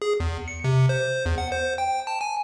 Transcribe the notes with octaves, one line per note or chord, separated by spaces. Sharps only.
G#4
E2
C#7
C3
C5
E2
F#5
C5
G5
A5
G#5